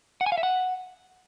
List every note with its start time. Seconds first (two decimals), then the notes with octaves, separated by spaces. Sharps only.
0.21 F#5
0.26 G#5
0.32 F5
0.38 E5
0.43 F#5